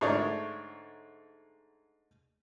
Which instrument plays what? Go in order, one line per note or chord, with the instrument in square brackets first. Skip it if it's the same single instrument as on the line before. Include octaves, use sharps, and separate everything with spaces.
[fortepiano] G#2 D3 A3 A#4 C#5 D5